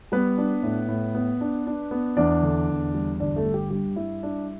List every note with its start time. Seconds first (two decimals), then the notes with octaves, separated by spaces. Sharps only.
0.12 G3 B3 B4
0.38 D4
0.63 A2
0.89 A2
1.15 B3
1.41 D4
1.67 D4
1.91 B3
2.17 E2 D4 D5
2.43 D3
2.69 E2
2.94 G3
3.20 G1 D4 D5
3.36 A3 A4
3.45 G3
3.54 G4
3.71 G2 G4
3.96 G3 E4
4.23 D4